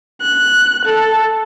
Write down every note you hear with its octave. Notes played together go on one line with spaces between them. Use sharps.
F#6
A4